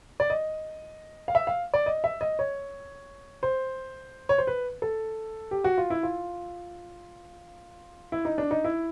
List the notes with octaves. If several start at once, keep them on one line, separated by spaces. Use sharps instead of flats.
D5
D#5
F5
E5
F5
D5
D#5
E5
D#5
C#5
C5
C#5
C5
B4
A4
G4
F#4
F4
E4
F4
E4
D#4
D4
D#4
E4